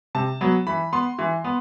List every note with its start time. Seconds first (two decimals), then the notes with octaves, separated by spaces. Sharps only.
0.15 C3 A5
0.41 F#3 B3
0.67 E3 B5
0.93 B3 C6
1.19 E3
1.44 B3